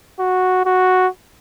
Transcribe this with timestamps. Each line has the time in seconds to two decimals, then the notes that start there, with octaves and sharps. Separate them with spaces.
0.19 F#4
0.66 F#4